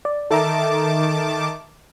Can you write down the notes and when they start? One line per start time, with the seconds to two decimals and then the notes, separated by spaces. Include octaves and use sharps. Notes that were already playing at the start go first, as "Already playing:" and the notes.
0.05 D5
0.31 D#3 A4 E5 A5 A#5 D6